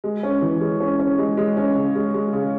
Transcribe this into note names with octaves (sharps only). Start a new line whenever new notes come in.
G#3
C#4
E3
G#3
C#4
C#4
G#3
G#3
C#4
C#3
G#3
G#3
C#3